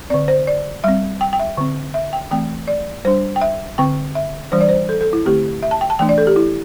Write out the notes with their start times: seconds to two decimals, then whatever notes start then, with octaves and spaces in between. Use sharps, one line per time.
0.10 D3 C4 D5
0.28 C5
0.47 D5
0.84 G3 C4 E5
1.21 G5
1.33 G5
1.39 E5
1.57 D3 C4
1.94 E5
2.13 G5
2.31 E3 A3 C4 G5
2.68 D5
3.05 G3 D4 C5
3.36 G5
3.41 E5
3.78 D3 C4 G5
4.15 E5
4.52 E3 G3 D4 C5
4.61 D5
4.69 C5
4.89 A4
5.01 A4
5.13 E4
5.25 D3 A3 C4 G4
5.63 E5
5.71 A5
5.81 G5
5.90 A5
5.99 E3 A3 D4 G5
6.09 D5
6.18 A4
6.27 G4
6.36 E4